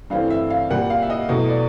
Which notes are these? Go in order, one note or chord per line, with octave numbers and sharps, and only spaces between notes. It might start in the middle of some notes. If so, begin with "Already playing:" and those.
G2 E3 A3 C4 F5
E5
F5
A#2 G3 A#3 F#5
F5
E5
D#5
E2 B2 F#3 A3 D#5
D5